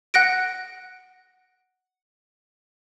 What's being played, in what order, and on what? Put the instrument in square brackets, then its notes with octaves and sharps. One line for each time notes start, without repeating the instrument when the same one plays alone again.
[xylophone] F#5 F#6 A#6 D7